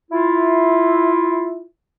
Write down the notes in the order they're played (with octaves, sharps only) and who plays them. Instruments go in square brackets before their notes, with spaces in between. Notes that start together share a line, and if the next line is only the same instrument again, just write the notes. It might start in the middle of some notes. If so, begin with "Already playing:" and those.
[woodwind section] E4 F4